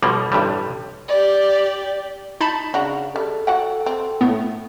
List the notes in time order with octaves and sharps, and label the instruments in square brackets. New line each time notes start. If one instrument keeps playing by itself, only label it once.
[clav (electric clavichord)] B1 B2 F3 G3 A#3
A1 G2 D3 G3
[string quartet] G4 D5
[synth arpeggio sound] D#4 A5 B5
[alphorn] C#3 [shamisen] D4 F#4 [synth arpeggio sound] A#5
[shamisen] G3 [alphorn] A4
[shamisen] F#4 F#5 G5
C4
[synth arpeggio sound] A2 A3 B3